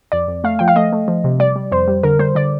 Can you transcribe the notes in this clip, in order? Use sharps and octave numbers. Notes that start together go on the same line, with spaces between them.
F2 D5
F2
A3 F5
F3 G5
F5
A3 D#5
A3
F3
C3
G3 D5
G3
F2 C5
G3
D3 A#4
G3 C5
D3 D5